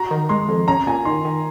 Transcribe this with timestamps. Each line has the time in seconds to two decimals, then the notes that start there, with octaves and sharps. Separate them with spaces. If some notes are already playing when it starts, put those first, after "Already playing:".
Already playing: F#4 A#5
0.11 D#3
0.29 G#3 C6
0.49 F2
0.68 C#4 A#5
0.87 A#2 G#5
1.05 D#3 C6
1.25 D#3